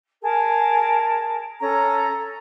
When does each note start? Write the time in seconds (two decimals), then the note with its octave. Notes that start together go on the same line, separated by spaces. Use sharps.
0.21 G#4 A#4 A5
1.59 C#4 A4 A#5